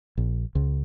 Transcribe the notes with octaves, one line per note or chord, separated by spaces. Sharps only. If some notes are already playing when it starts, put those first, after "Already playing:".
A#1
C#2